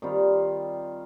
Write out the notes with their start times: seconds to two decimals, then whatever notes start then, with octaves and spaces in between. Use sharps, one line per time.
0.02 D#3 G3 C4 F4